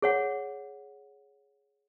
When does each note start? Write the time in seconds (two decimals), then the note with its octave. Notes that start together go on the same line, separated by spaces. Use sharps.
0.02 G#4 C#5 F#5